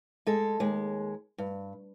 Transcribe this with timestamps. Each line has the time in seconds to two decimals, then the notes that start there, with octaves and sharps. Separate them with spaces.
0.27 G#3 A4
0.60 D#2 G#3
1.38 G2